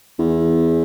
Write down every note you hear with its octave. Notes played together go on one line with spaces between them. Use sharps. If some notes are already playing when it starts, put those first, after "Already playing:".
E2